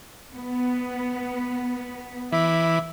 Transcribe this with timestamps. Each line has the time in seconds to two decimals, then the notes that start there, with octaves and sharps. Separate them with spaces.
0.35 B3
2.32 E3 E5 B5 D6